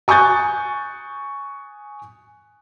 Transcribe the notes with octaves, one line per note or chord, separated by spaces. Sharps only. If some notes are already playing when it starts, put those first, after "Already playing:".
G#5 C#6 D#6 F#6 G6 A6